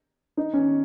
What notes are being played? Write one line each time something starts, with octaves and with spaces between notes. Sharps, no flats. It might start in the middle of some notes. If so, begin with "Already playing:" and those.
D#4
C#4